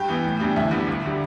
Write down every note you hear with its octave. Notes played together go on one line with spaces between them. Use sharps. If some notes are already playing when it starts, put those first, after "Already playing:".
Already playing: G2 G4
E3 B3
A2
E3 G3 B3 D4
D2 E4
D3 G3 B3
G1
D3 G3